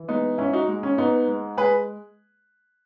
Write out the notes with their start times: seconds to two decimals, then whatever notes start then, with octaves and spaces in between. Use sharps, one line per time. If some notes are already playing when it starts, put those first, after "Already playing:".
Already playing: E3
0.08 G#3 B3 D#4
0.38 G#2 C#4 E4
0.53 D#4 F#4
0.68 G#3
0.83 C#4
0.98 G#2 B3 D#4
1.28 G#3
1.57 G#3 G#4 B4